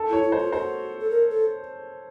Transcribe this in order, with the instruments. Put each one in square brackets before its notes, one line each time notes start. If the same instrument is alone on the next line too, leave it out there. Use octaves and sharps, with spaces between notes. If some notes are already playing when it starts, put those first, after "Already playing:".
Already playing: [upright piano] A4
[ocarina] E4 [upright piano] C#5
[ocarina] E4
[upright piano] C5
[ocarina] F4
[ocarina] F#4 [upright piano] C5
[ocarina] A4
A#4
A4